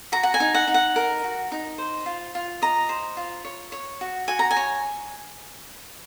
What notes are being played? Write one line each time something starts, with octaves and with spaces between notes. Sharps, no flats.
F#4 A#5
F#5
G#5
D#4
F#5
D#4
F#5
A#4
F#4
D#4
C5
F4
F4
D#5 A#5
C5
F4
C#5
C#5
F#4
F#4 G#5
A#5
G#5
C#5